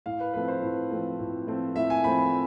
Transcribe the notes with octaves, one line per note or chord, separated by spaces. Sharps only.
A2 F5
B4
F3 A3 C4 B4
C5
A2
F3 A3 C4
A2
F3 A3 C4
A2 E5
G#5
F3 A3 C4 B5
B5